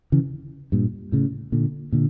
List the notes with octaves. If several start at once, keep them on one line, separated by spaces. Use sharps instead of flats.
C#3 E3
G2 A#2
A2 C#3
A#2 D3
A#2 D3